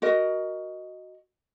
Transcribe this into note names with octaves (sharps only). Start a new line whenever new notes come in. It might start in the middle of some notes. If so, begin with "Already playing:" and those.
F#4 A#4 D#5